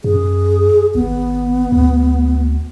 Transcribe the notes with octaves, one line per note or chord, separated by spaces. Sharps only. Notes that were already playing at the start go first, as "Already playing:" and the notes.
F#2 G#4
G#1 B3
D2